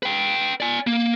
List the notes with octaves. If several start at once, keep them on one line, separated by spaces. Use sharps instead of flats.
B4 G5
D5 G#5
A#3